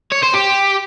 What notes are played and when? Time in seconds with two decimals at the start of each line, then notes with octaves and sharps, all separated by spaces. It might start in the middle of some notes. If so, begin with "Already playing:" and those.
0.12 C#5
0.23 C5
0.34 G4